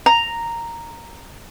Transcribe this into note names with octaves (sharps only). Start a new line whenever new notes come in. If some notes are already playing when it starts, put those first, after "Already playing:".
A#5